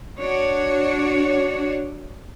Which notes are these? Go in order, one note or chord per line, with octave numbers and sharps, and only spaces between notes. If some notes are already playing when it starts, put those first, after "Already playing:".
D4 F#4 C#5